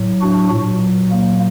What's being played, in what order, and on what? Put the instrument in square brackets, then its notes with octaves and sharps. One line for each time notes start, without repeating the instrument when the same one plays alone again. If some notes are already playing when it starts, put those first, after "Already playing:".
Already playing: [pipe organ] A2 F#3
D4 F#4
A#2 F#3
A#3